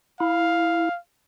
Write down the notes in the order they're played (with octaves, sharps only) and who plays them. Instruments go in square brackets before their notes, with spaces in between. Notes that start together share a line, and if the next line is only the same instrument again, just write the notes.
[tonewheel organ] E4 [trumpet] F5